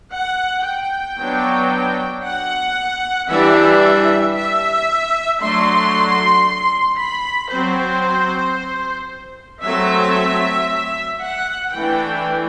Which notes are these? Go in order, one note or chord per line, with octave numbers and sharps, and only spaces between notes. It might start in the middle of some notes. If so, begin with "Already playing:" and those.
F#5
G5
F#3 B3 D4
F#5
E3 G3 D4 E5
E5
F#3 A3 D4 C6
B5
F#3 C4 C5
F#3 A3 C4 E5
F#5
E3 A3 D4 G5